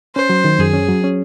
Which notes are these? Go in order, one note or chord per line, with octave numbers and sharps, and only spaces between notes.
C#4 C5
F#3
D#3
F#2 G#4
C#4
F#3
C#4